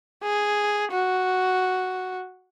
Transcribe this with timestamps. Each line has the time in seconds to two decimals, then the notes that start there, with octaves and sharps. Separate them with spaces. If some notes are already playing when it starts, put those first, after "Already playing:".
0.23 G#4
0.91 F#4